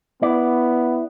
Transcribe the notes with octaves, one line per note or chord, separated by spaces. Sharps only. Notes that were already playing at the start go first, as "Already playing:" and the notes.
B3 E4 D5